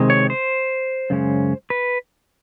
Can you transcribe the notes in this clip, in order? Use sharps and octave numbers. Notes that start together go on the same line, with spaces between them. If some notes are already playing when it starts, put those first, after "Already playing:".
Already playing: C3 D#3 G#3 C4
C#5
C5
F#2 C#3 G#3 C#4
B4